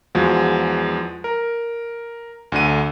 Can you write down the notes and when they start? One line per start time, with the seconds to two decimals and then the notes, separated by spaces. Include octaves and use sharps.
0.15 E2 F3 G#3 F#4
1.24 A#4
2.52 D2 D3 D#7